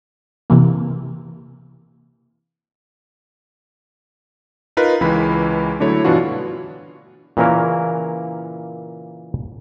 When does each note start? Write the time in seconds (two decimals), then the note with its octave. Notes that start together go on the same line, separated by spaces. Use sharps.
0.50 C3 E3 A#3
4.77 D#4 F4 A#4 B4
5.01 C#2 E3 G#3 B5
5.80 D3 F#3 A3 E4 C#5
6.05 G2 B2 E3 D4 F4 F#4
7.37 A#2 C#3 E3 A#3 C#4 A#4